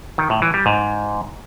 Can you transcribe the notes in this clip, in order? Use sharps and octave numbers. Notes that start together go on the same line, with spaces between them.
D#3
A2
E3
G3
G#2